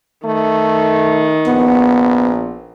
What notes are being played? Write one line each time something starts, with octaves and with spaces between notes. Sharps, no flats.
D#3 A3
A#1 B3